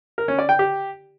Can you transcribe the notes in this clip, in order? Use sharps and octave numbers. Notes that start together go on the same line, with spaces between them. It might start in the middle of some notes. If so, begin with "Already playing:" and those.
A#4
C#4
D5
G5
G4